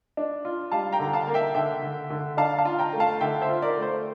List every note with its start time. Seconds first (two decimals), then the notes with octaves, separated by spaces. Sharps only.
0.17 D4
0.45 F4
0.72 G3 F5 A5
0.93 G5 A#5
1.00 D3
1.13 F5 A5
1.27 A#3
1.34 E5 G5
1.55 D3 E5 G5
1.82 D3
2.10 D3
2.37 D4 F5 A5
2.58 F5 A5
2.65 F4
2.79 G5 A#5
2.93 A3
3.00 F5 A5
3.21 D3 E5 G5
3.41 C5 E5
3.49 F4
3.62 A#4 D5
3.77 A3
3.82 C5